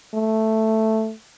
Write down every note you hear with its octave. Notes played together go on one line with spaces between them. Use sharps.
A3